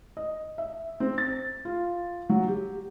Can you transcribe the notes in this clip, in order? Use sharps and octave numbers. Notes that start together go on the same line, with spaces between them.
D#5
E5
C4
A6
F4
F#3
G4